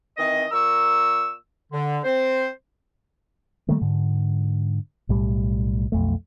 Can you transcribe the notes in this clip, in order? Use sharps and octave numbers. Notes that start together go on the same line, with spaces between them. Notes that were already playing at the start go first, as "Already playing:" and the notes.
D#3 E3 C4 D#5
A#2 A#4 C#6 E6
D3
C4 C5
D#3 G3 A3 A#3
G#2 D3
B1 A2 G3
B1 F2 A3